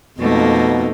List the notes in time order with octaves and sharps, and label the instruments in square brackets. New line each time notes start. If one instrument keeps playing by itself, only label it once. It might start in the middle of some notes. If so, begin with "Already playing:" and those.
[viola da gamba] F2 D#4 A4 [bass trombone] B2 [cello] A3 A#3